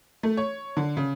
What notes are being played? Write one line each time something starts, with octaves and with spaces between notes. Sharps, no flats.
A3
C#5
D3
C#3